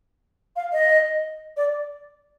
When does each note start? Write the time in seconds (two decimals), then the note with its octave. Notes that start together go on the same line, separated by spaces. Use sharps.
0.56 F5
0.73 D#5
1.57 D5